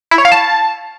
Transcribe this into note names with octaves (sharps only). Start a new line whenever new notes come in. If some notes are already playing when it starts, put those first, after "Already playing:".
E4
C#5
F5
A5